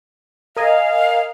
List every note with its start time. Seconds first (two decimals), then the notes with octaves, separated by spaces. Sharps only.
0.56 A#4 D#5 F5 G#5